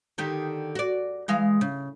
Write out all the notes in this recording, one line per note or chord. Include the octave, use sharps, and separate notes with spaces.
D3 D#3 G4
F#4 D5
E3 G#3 F5
C#3